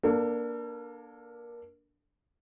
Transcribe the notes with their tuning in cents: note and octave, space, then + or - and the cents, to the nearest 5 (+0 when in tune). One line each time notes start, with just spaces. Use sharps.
A#3 +25 D4 +0 A4 +40